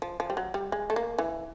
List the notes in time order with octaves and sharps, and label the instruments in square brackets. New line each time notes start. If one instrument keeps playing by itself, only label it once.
[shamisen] F3
F3
G3
F#3
G3
G#3
A3
A#3
E3